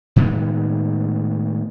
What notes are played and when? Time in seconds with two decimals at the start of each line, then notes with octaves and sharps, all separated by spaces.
0.16 A2 D#3 G#3 B3